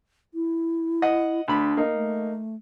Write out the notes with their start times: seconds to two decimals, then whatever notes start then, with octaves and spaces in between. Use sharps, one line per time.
0.34 E4
1.02 D#5 F#5
1.48 D2 D4 B5
1.77 A#3 D#4
1.94 A3